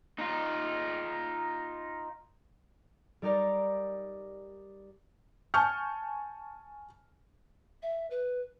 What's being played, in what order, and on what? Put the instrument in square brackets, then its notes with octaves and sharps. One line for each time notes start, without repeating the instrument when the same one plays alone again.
[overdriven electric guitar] D#4 F4
[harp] G3 D#4 G4 A#4 D5
[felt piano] G#5 A5 C#6 F6 G6
[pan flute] E5
B4